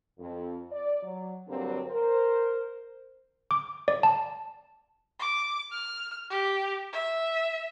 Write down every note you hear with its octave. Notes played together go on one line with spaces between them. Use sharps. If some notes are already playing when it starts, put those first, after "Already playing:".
F2
D5
F#3
G2 D3 F#3 G3 A#3 C4
A#4 C5
D6
D5
A5
D6
F6
G4
E5